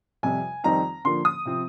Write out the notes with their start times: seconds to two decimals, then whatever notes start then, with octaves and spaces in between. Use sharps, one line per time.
0.23 F2 C3 G3 G#5
0.64 F2 D#3 G3 C4 D#4 A#5
1.04 D3 F3 A#3 C6
1.25 D#6
1.45 C3 F3 C4